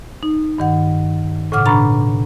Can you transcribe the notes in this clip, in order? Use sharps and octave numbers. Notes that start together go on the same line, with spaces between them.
D#4
G2 D#3 F#5
A2 C#3 F#5 D6 F6
B2 D4 A#5 B5 C#6 A6